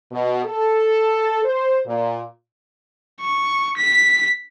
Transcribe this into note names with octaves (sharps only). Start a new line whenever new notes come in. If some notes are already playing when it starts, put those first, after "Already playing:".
B2
A4
C5
A#2
C#6
B6